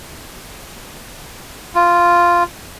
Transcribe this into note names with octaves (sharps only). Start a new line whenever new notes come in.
F4